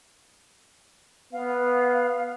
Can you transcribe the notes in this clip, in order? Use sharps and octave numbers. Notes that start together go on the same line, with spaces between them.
B3 F5